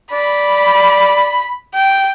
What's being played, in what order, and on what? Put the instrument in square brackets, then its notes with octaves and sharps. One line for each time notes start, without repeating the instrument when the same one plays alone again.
[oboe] D5 [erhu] B5
[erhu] G5